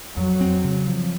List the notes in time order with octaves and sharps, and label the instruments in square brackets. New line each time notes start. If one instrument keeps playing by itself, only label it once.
[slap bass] F2 [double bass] F#3
[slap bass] C4
C#3
F3